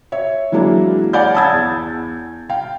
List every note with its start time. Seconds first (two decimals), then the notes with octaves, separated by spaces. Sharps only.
0.12 C#5 E5
0.52 E3 F#3 G#3 A#3 D4 E4
1.13 C#5 D5 F5 F#5 G#5 G6
1.34 A5 B5 D#6 E6 G#6 A6
1.52 E2
2.49 F5 G5